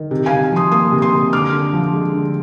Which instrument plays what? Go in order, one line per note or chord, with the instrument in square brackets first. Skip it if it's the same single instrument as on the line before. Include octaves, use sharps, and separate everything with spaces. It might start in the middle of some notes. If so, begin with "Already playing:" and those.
Already playing: [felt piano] D#3
C3
C3 F5 G#5
F3 C6 D#6
A#3 C6 D#6
C3
C6 D#6
C3
D3 D6 F6
D3
F3
G#3
D3